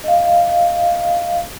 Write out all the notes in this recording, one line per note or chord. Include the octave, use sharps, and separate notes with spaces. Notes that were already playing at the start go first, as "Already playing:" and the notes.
D#5 F5